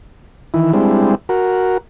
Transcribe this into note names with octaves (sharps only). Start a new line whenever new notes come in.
D#3 E3 E4
G3 G#3 C4 D4 E4
F#4 A#4